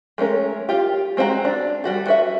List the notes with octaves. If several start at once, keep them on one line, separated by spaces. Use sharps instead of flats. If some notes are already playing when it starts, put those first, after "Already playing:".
G#3 A3 C#4 A#4
F4 G4
G#3 C4 D4 F#4 A#5
D4
G3 F#4 A4
F#4 B4 E5